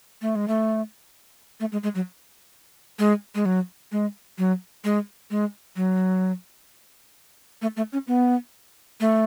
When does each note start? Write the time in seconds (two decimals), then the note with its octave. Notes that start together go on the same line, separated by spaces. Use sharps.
0.22 A3
0.35 G#3
0.48 A3
1.60 A3
1.72 G#3
1.83 G#3
1.95 F#3
2.99 G#3
3.35 G#3
3.45 F#3
3.92 G#3
4.38 F#3
4.84 G#3
5.31 G#3
5.76 F#3
7.62 A3
7.76 A3
7.93 C#4
8.07 B3
9.00 A3